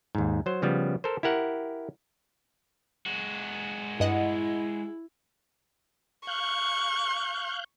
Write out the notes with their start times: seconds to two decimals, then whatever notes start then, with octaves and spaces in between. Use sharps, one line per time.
0.15 D#2 G#2
0.46 F#3 C5
0.62 C#3 F3 G3 B3
1.04 A4 A#4 C5
1.23 E4 G4 A#4 F#5
3.06 G#3 F#4
4.00 G2 E4 D#5 F#5
6.27 F5 C#6 F#6 G6